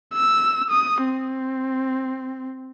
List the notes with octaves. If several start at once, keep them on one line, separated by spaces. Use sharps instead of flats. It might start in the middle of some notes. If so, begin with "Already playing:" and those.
E6
D#6
C4